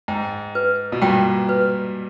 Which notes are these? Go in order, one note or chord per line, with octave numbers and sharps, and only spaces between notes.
G#2 G5
B4
B2
G2 A#2 G5
B4